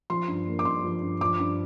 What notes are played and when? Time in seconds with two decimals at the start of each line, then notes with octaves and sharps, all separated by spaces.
0.10 F3 C6
0.28 G2
0.47 A#3
0.59 D6
0.65 G2 C6
0.84 F3
1.02 G2
1.21 F3 D6
1.40 G2